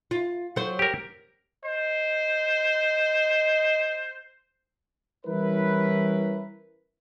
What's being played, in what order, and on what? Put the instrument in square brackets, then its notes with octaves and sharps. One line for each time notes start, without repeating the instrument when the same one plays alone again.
[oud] F4
F#3 C5
[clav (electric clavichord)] G4 A#4
[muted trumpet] C5 [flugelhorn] D#5
[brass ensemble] E3 G3 C#4 E4 A#4 B4